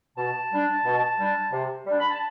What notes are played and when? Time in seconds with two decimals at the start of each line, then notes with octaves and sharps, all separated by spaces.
0.17 B2 A5
0.51 G3 D4
0.85 B2
1.19 G3 D4
1.52 C3
1.86 G3 D4
2.00 B5
2.10 A5